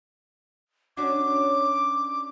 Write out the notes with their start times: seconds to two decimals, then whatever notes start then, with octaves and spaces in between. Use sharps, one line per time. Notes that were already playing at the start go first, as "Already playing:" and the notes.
0.97 C#4 D4 F#4 D6